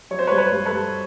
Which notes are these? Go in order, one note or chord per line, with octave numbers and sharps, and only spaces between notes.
F#3 C#5
C5
B4 C#5
G2
B4 C#5
G2
A4 B4
G2